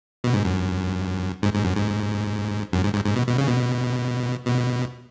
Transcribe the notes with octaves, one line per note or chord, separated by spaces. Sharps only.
B2
G#2
F#2
G#2
G#2
F#2
G#2
F#2
G#2
G#2
G#2
B2
B2
C#3
B2
B2